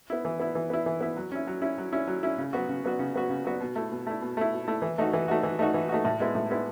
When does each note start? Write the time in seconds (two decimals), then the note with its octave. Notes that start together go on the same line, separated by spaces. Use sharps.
0.10 B3 E4
0.25 E3
0.39 B3 E4
0.55 E3
0.70 B3 E4
0.86 E3
1.01 B3 E4
1.16 F#3
1.32 C#4 E4
1.47 F#3
1.62 C#4 E4
1.78 F#3
1.92 C#4 E4
2.07 F#3
2.23 C#4 E4
2.38 C#3
2.53 F#3 B3 F#4
2.69 C#3
2.84 F#3 B3 F#4
2.99 C#3
3.14 F#3 B3 F#4
3.30 C#3
3.45 F#3 B3 F#4
3.60 B2
3.76 A3 E4
3.91 B2
4.07 A3 E4
4.21 B2
4.37 A3 E4
4.53 B2
4.68 A3 E4
4.82 E3
4.98 A3 D#4 F#4
5.13 E3
5.28 A3 D#4 F#4
5.44 E3
5.59 A3 D#4 F#4
5.74 E3
5.89 A3 D#4 F#4
6.05 A2
6.20 G#3 B3 E4
6.35 A2
6.50 G#3 B3 E4